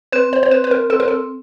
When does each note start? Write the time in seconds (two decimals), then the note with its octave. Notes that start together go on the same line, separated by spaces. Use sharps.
0.12 C4 B4
0.33 C5
0.43 C5
0.51 C4 B4
0.64 B4
0.71 A#4
0.90 C4 A4
1.00 A#4
1.08 A4